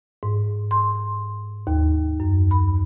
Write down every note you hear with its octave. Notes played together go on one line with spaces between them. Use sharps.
G#2
C6
D#2
F#2
B5